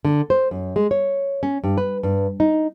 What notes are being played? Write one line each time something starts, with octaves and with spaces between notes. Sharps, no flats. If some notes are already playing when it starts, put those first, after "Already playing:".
D3
C5
F#2
G#3
C#5
C#4
G2
B4
G2
D#4